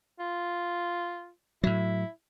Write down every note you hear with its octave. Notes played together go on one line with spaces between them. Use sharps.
F4
A2 F#3 E4